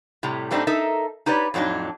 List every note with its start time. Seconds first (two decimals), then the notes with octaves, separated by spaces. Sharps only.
0.23 A2 C3 G3
0.51 G#2 G3 A3 C4 D4 D#4
0.67 D#4 A4 A#4 E5
1.26 D#4 G4 B4 C#5 D5
1.54 F2 A2 F#3 D4 D#4